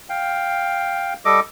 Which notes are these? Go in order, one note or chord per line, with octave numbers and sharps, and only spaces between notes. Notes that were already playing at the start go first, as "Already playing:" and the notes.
F5 G5
G3 A4 D#5 D6